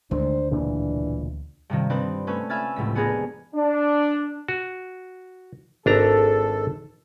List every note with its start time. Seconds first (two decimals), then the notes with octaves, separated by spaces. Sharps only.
0.11 D2 D#3 G#3 A3 D4 C5
0.51 E1 A#2 C#3 E3 D4
1.70 G2 C3 D#3
1.90 C4 D4 D#4 B4
2.27 A3 C#4 B4
2.50 E5 G#5 B5 F6 G#6 A6
2.76 F1 C#2 A2 B6
2.95 B3 D4 G#4 A#4 B4
3.56 D4
4.48 F#4
5.86 G#1 D4 A4 A#5